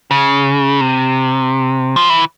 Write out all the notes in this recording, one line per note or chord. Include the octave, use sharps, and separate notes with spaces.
C#3
C3
F3
E3